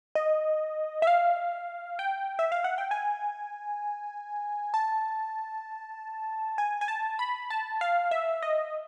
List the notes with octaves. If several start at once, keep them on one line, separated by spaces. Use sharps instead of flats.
D#5
E5
F5
G5
E5
F5
F#5
G5
G#5
A5
G#5
G#5
A5
B5
A5
F5
E5
D#5